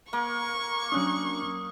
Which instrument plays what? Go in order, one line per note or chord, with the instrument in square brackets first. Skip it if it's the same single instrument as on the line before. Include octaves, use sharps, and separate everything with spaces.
[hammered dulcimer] A#3 [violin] C#6
[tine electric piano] F#3 C#4 D4 [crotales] D#6 F#6